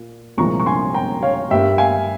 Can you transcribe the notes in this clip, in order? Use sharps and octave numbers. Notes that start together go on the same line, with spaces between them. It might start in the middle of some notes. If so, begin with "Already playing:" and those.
Already playing: A#2
C2 A#2 F3 G#3 A#5 C#6
C#6
G#5 C6
G5 A#5
C#5 F5
G2 G3 A#3 E5 G5
F5 G#5